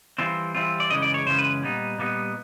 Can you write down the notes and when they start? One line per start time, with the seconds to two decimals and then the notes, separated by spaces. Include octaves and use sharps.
0.18 E3 G3 C4 F4
0.55 E3 G3 C4 F4
0.80 D5
0.90 F#2 C#3 E3 G#3 C#4 D#5
1.02 D5
1.14 C#5
1.26 F#2 C#3 E3 G#3 C#4 C5
1.39 B4
1.62 A#2 G3 B3 D#4
1.98 A#2 G3 B3 D#4